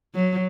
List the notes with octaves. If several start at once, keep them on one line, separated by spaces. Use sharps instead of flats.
F#3